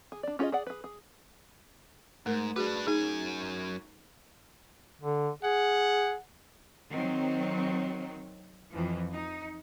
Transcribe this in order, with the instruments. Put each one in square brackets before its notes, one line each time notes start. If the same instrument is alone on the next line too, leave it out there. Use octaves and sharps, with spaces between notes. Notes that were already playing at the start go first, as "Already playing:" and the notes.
[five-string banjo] G#4
D4 D5
C#4 F4 G#4 C5 D#5
G#4 D5 F#5
G#4 B4
G#4
[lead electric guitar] G#2 [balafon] A3 A#4
[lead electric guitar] D4 B4 [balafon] F#4 G#4
[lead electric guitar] F#2 G#5 [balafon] D#4 G#4
[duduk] D3
[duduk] G#4 [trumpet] F#5
[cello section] D#3 F#3 C4
F2 E3 F3
D#4